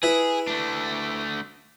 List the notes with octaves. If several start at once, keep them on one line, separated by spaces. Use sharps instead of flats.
E4 G#4 B4
A3 D4